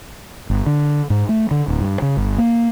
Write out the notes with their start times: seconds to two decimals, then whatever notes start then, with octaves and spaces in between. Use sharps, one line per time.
0.50 G1
0.66 D3
1.10 G#2
1.29 A3
1.51 D3
1.68 D1
1.81 G2
2.02 C#3
2.17 G1
2.38 A#3